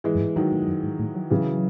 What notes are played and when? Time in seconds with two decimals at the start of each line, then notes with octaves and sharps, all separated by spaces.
0.04 E3 G#3
0.15 F#2
0.20 G#2
0.36 G#2 D#3 F#3
0.52 A2
0.63 G#2
0.68 F#2
0.83 G#2
0.99 A2
1.15 F#3
1.30 C#3 E3 F#3